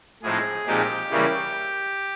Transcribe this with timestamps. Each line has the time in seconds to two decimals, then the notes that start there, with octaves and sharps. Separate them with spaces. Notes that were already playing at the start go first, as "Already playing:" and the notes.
0.23 A2 F3 G#3 C4 D#4 G#4
0.66 A#2 F3 G#3 C4 D#4 G4
1.10 C#3 E3 G3 A#3 C#4